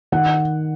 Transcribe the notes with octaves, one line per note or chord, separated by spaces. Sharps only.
D#3 F#5